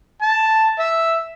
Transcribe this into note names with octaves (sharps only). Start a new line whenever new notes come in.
A5
E5